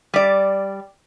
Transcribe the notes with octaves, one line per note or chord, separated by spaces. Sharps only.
G3 D5